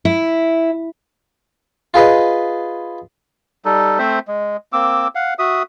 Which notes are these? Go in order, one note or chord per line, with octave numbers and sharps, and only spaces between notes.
E4
F4 G#4 B4 D#5
G3 D#4 A4
A3 C4 C5 E5
G#3
A#3 C4 D6 E6
F5 F#5
F#4 E5 D#6